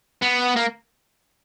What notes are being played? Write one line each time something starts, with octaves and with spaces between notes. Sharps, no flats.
B3
A#3